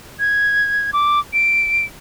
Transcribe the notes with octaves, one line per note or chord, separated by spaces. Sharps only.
G#6
D6
D7